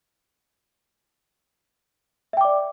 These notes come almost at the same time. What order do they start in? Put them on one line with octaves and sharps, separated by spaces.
E5 G5 D6 D5